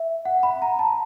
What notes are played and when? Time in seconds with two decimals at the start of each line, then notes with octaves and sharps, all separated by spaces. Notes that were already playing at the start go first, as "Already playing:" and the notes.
Already playing: E5
0.25 F#5
0.43 B5
0.62 A#5
0.79 A5